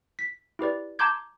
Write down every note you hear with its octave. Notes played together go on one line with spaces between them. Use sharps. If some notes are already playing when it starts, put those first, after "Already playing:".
B6
E4 G4 B4 D5
A5 A#5 C6 D6 G6 G#6